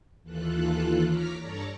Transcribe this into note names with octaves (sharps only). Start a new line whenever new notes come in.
D#2 E3 F4 A4 F#6
C#5 A#5 D6 F6 B6
G2 A4 C#5 D5 A5 A#5